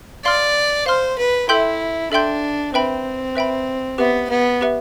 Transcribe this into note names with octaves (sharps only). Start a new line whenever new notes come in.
D5 F5 C6 F6
C5 F5 C6 F6
B4
E4 A4 E5 G5 C6 G6
D4 A4 E5 G5 C6 G6
C4 B4 E5 G5 B5
B4 E5 G5 B5
B3 G4 B4 E5
B3
G4 B4 E5